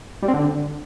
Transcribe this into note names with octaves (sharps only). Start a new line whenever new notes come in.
G3
C4
D3